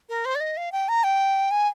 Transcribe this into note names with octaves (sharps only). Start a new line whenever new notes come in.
A#4
C5
D5
D#5
F5
G5
A#5
G5
G#5